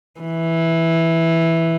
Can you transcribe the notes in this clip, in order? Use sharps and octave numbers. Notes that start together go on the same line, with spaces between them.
E3